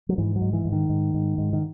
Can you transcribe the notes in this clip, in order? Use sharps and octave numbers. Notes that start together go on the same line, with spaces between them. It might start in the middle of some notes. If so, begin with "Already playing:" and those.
F#3
G#2 E3
F#3
G#2
E3
G#2
D#3
G#2
G#2
G#2
D#3